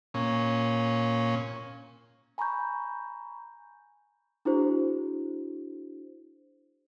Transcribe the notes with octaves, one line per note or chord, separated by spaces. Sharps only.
A#2 C#4
G#5 A#5 B5 C#6 G6
D4 E4 F#4 G#4 C5